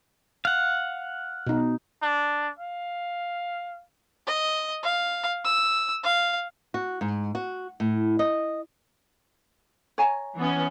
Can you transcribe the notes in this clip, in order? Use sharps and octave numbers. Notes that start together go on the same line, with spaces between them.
F5 F#5
B2 D#4
D4
F5
D#5
F5
E6
F5
F#4
G#2
F#4
A2
D#5
C#5 G#5 A#5
E3 B3 C#4